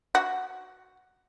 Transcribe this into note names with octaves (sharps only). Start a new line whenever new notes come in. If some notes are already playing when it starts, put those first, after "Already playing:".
F#4